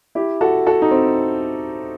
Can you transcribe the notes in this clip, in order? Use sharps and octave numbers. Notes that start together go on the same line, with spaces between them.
E4 G4
F#4 A4
F#4 A4
D#4
C4